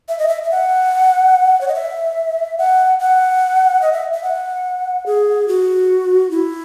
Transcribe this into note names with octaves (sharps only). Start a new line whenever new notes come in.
E5
D#5
E5
E5
F#5
C#5
D#5
E5
F#5
F#5
D#5
E5
E5
F#5
G#4
F#4
E4